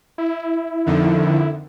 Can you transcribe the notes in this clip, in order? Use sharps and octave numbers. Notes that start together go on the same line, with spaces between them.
E4
F2 D3 D#3